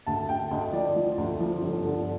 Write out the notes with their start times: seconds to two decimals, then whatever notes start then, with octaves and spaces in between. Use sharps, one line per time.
0.07 D2 A5
0.29 D2 G5
0.51 D2 D#5
0.73 F3 D5
0.96 F3
1.18 D2
1.40 F3
1.62 G1
1.85 D3